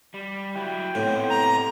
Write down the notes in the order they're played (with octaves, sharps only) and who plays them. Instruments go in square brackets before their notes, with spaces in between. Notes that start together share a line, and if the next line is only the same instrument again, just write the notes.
[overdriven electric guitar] G3
[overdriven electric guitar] F#3 E4 [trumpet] G5
[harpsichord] A2 [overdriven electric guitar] C3 B3
[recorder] A#5